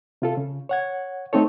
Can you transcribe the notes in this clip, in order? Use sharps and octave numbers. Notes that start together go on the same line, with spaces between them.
C3 F4 A4
C#3
C#5 F#5 G#6
A3 C4 D#4 A4 C#5